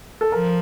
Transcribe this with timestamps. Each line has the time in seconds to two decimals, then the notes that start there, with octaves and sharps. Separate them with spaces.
0.21 A4
0.31 F3 A#4